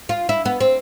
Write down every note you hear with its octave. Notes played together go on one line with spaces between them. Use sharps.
F4
E4
B3
C4